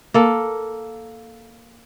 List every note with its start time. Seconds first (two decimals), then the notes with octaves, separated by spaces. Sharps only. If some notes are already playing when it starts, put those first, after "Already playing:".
0.14 A#3 A4